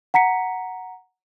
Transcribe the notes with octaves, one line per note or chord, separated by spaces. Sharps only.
F#5 A#5 B6 C#7